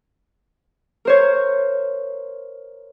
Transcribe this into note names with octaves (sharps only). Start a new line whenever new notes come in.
A#4 C5 C#5